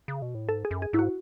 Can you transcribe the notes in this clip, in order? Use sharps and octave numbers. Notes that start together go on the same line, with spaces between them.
C#3
B2
A2
G#2 A4
G#4
F#2
G#4
G#2 E4
F#4